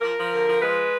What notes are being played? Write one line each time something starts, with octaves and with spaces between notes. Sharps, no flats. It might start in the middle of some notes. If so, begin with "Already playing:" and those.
F3 A#4
F3
D3
F3
G#3 B4